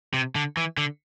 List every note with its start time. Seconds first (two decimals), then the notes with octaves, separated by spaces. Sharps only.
0.14 C3
0.35 D3
0.57 E3
0.77 D3